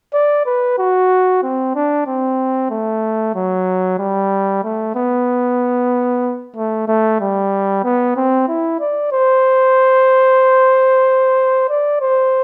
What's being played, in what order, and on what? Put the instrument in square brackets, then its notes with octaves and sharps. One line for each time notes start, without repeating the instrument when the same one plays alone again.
[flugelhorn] D5
B4
F#4
C4
D4
C4
A3
F#3
G3
A3
B3
A3
A3
G3
B3
C4
E4
D5
C5
D5
C5